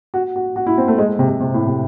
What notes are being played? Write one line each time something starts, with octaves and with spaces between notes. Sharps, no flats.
F#4
F#4
F#4
E4
C4
A3
G#3
C3
C3
C3
A2
C3